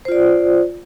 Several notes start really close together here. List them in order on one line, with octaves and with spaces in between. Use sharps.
C5 F4 D5